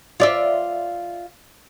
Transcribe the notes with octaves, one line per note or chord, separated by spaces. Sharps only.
F4 D5 E5